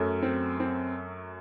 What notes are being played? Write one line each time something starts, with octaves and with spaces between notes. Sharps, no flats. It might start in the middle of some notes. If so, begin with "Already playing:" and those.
Already playing: F#2 F#3 A3
C4
C4